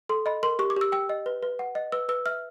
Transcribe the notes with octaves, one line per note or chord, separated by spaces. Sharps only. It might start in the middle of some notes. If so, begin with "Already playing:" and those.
A4 C6
D#5 B5
A#4 C6
G4 C#6
D6
G4 E6
G5 E6
D#5
B4
B4
F#5
D#5
B4 E6
B4 E6
E5 F6